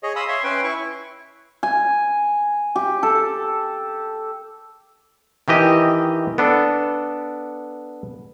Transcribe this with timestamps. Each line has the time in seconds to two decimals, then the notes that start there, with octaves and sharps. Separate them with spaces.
0.03 G#4 C#5 D#5
0.16 F5 B5 C6 D#6 E6
0.28 C#5 E5 C6
0.44 C#4 B4 G5 C6
0.64 E4 C#6
1.63 G#5
2.76 G4
3.03 A4
5.48 D#3 E3 G4 D#5
6.38 B3 D4 A4